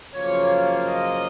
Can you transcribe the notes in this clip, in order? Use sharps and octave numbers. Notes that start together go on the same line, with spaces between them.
F#2 C#3 F3 A#3 F4 C#5
D#5